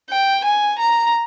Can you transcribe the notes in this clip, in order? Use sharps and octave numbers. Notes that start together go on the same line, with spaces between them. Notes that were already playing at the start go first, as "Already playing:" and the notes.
G5
G#5
A#5